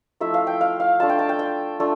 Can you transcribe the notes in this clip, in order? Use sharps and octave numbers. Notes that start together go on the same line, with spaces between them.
F3 A3 E4 E5
F5
G5
F5
F5
A3 D4 F4 A5
G5
A5
G5
G5
A3 D4 F4